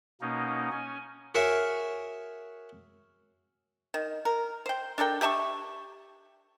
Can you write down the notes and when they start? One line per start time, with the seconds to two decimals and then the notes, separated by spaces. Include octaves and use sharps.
0.21 B2 A#3 C#4 D#4
0.72 C#4 G#5
1.35 F#4 G#4 A#4 C#5 E5 F5
3.94 D#3
4.25 A#4
4.66 C5 G5
4.98 D4 A4 A#4 G5
5.21 G4 E5 A5 C#6